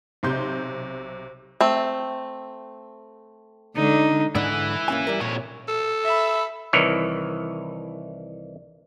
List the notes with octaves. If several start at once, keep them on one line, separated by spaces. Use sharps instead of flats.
B1 C3 C6 G6
A3 C4
D3 G#3 D4 D#4
G#2 D3 E4 B4 D5
A#3 C#4 G#5
G3 A#4
F2 A#2 C#5
A4
E5 B5
C2 D#3 E3 C#5